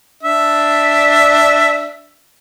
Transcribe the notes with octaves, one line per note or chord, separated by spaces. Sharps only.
D4 E5